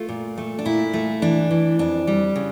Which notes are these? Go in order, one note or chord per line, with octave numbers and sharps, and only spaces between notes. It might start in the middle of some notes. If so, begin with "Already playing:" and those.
Already playing: A3 F4
A#2
A3
D4
A#2 E4
A3
E3 D4
E3
F2 D4
G3
C#3